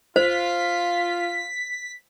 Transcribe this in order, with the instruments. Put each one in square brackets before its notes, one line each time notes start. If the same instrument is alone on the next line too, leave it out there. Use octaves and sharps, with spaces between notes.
[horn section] F4 [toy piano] C5 [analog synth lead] B6